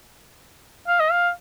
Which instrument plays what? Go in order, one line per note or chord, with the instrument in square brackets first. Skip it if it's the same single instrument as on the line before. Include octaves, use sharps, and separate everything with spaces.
[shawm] F5
D#5
F5